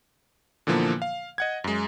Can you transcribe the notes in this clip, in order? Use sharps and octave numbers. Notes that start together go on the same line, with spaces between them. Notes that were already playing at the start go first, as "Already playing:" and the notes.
A#2 D3 E3 F3 A#3 B3
F5
D#5 F#5 G#6
F#2 G#3